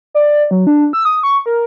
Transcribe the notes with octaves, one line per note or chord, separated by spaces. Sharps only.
D5
F#3
D4
E6
D#6
C#6
A#4